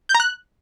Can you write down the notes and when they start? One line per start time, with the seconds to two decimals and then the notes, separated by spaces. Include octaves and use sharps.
0.09 G6
0.15 A#5
0.20 F#6